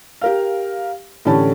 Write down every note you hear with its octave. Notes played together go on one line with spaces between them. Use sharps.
G4 A#4 F5
A2 D3 E3 C#4 G4 A5